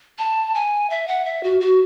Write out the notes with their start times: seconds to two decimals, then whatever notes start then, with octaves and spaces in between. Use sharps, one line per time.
0.18 A5
0.55 G#5
0.90 E5
1.08 F#5
1.25 E5
1.44 F#4
1.60 F#4